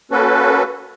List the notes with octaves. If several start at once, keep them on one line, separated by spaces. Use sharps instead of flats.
A#3 C#4 F#4 A4 B4